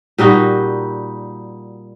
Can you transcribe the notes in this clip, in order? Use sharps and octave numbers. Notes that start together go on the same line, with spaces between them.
A#2 G3 D#4 F#4